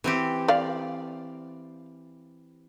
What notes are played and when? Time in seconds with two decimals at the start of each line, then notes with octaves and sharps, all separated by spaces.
0.04 E3 C4 G4
0.48 D5 F5